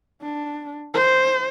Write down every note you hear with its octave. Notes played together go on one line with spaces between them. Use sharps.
D4
C5